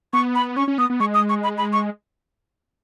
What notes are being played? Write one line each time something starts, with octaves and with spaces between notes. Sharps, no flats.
B3 C#6
B5
C#4 C#6
C#4
B3 D#6
B3
G#3 C#6
D#6
C#6
B5
B5
C#6